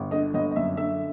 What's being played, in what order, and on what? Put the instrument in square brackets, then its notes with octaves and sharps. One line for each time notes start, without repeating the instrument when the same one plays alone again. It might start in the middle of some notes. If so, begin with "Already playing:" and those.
Already playing: [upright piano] G1
D3 D#5
G1 D#5
D#5
F#2 E5
D3 E5